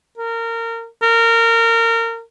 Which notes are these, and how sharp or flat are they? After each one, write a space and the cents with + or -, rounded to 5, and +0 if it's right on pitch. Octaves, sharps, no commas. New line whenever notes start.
A#4 -25
A#4 -25